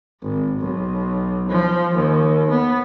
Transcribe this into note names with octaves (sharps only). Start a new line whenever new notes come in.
G#1
B1
F3
D#2
B3